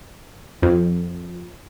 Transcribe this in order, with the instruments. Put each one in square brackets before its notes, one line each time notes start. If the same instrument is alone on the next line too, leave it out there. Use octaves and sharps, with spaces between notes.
[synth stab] F2